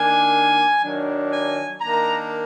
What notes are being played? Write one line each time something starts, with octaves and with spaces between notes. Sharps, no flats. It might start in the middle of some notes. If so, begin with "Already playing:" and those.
Already playing: D#3 A#3 D4 G#5
D#3 F#3 D4
G#5
D#3 A#3 D4 A#5